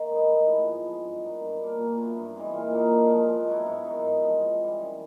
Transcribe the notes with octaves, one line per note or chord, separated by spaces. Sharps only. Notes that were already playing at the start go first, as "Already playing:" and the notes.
Already playing: D#3
G#3 B3 D#4
A2
F3 G#3 B3
G#2
F3 G#3
G2
D#3 F#3 B3
G2
D3 F#3 A#3
A#2
F#3 B3 E4
G2
E3 G#3 C4
A#2
F#3 A#3 D#4
D3
F3 G#3
B2
F#3 B3 E4
G#2
D#3 F#3
G#2
F3 G#3 C4
C3
E3 G3
F#2